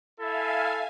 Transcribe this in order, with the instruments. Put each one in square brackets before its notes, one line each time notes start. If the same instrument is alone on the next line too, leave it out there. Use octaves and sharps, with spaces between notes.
[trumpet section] E4 A4 [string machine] E5 F5 G#5